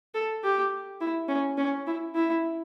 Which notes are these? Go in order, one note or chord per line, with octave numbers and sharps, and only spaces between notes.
A4
G4
E4
C#4
C#4
E4
E4